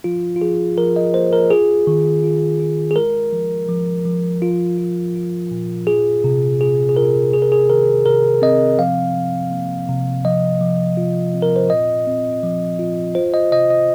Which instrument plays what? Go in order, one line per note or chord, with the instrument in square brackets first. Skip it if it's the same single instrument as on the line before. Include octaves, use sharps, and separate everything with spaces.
[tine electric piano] F3 F4
F4
F3 G#4
F3 A#4
D#5
A#3 C5
A#4
F4 G#4
D#3
F4
F4
G#4
G#3 A#4
F3
F3
F3
F4
F4
F4
A#2
F4 G#4
C3
F4 G#4
G#4
F4 A#4
C3 G#4
A#4
G#4
D#3 A#4
C3 A#4
C4 D#5
F3 F5
F3
A#3
C3
F3 D#5
F3
F4
C4
A#4
C5
A#2 D#5
C4
F3
F4
F4 C5
D#5
C3 D#5
D#5